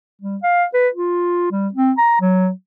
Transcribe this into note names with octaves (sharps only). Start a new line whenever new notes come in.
G3
F5
B4
F4
G3
C4
A#5
F#3